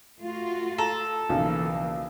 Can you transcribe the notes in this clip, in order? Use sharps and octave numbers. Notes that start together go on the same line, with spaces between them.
A3 F4 F#4
A4 A#5
B1 C#3 E3 F3 A#3